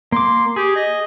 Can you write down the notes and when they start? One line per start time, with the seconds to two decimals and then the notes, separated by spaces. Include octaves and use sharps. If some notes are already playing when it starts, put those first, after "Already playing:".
0.12 A#3 C6 D6
0.56 G4 G#4
0.76 D#5